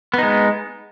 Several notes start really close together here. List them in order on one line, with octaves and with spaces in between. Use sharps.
B3 D#4 G#3